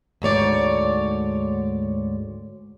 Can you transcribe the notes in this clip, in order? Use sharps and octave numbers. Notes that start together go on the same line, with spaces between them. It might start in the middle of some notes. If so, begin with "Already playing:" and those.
D2 G#2 C#5 D5